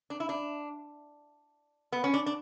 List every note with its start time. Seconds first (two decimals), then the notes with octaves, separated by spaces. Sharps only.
0.10 D4
0.20 E4
0.29 D4
1.92 B3
2.04 C#4
2.14 D4
2.26 D4